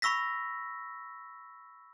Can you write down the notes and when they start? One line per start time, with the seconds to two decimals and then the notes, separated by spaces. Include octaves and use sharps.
0.02 B5 C#6 E6 A#6 B6